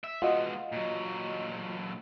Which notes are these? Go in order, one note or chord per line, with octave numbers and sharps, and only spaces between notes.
E5
G#3 B3 F4 F#4 D#5
A#2 F#3